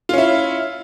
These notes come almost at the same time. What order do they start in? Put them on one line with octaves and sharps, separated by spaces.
F4 C#4 E4